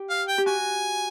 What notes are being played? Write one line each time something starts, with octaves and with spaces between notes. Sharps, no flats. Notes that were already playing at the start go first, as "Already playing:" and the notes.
Already playing: G4
F5
G5
G4
F#4 G#5